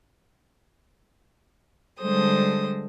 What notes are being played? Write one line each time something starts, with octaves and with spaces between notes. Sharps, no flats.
D3 G3 G#3 A4 C5 D#6